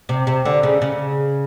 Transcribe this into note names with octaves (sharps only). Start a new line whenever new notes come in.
C3
C3
D3
C#3
C#3